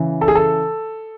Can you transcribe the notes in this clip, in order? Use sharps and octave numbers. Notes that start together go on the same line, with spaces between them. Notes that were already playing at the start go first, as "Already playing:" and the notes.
Already playing: C#3 E3
A4
G#4
A4